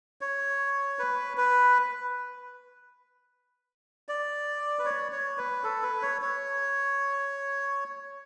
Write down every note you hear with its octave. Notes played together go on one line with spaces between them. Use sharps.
C#5
B4
B4
D5
B4
C#5
C#5
B4
A4
B4
C#5
C#5